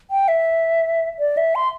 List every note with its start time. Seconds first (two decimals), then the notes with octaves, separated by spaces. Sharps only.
0.11 G5
0.28 E5
1.19 D5
1.37 E5
1.55 C6